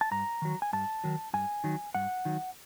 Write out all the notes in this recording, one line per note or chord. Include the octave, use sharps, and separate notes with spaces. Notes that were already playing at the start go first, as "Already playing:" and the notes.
A5
G2 A#5
D#3 F#3
G#5
G2 A5
D#3 F#3
G2 G#5
D#3 F#3
G2 F#5
D#3 F#3